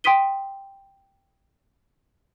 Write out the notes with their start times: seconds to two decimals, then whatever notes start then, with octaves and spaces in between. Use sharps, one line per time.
0.04 G5 C6 D#6 B6 D#7 G7